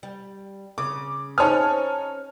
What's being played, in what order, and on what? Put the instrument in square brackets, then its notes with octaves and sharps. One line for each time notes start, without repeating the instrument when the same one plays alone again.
[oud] G3
[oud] C#3 [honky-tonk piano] D6
[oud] C#4 G#4 C5 [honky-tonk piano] D#4 C#5 G#5 [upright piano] A5 F6